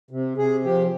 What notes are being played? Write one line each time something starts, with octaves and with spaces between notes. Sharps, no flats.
C3
C3 G#4
F3 G4